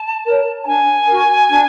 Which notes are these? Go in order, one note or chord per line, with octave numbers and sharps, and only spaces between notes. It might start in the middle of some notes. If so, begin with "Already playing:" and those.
Already playing: A5
A#4 C#5
A5
D4 G#5
F#4 A#4
D4